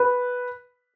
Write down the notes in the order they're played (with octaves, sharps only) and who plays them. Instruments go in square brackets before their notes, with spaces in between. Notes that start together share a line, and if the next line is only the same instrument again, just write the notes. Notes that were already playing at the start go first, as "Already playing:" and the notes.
Already playing: [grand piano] B4